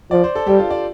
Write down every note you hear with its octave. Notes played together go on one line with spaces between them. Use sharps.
F3 D5
C5
A4
G3 G4
F4
D5